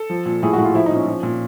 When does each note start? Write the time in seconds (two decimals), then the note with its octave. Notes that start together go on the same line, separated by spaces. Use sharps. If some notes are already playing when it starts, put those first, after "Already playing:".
Already playing: A4
0.10 F3
0.26 A#2
0.43 A2 G#4
0.53 F#4
0.58 A2
0.64 F4
0.74 F3 E4
0.86 D#4
0.90 A#2
0.96 C#4
1.07 F3
1.23 A#2